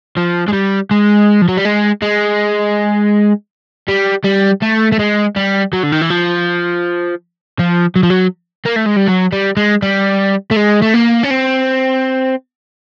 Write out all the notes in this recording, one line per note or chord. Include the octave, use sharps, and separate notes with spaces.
F3
G#3
G3
G#3
F3
F#3
G3
G#3
G#3
G3
G3
A3
A3
G#3
G3
F#3
D3
D#3
E3
F3
F3
F#3
F3
F#3
A#3
A3
G#3
G3
F#3
G3
G#3
G3
A3
G#3
A3
A#3
C#4
C4